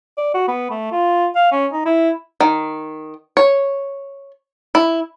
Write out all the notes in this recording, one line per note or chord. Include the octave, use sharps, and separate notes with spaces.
D5
F#4
B3
A3
F4
F5
C#4
D#4
E4
D#3
C#5
E4